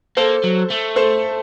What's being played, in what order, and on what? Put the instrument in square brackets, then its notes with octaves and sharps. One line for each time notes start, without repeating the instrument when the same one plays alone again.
[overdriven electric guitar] A#3 [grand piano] A4 C5
[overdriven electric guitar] F#3
A3
[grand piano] A4 C5